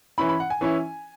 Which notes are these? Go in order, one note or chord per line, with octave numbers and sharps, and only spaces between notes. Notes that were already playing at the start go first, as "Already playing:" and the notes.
E3 C#4 E4 B5
B5
F#5
G#5
E3 C#4 E4